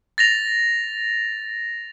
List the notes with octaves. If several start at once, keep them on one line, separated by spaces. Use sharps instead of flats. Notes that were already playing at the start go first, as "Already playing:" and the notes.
A6 A#6 F7